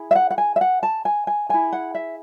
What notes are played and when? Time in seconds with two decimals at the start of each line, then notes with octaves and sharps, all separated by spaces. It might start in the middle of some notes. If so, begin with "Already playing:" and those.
Already playing: E4 G#4
0.11 E5
0.15 F#5
0.30 F#5
0.38 G#5
0.56 E5
0.61 F#5
0.83 A5
1.05 G#5
1.27 G#5
1.49 E4 G#4 G#5
1.72 F#5
1.95 E5